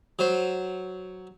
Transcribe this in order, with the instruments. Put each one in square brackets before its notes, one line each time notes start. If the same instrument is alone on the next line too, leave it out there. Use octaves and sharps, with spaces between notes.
[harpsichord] F#3 C5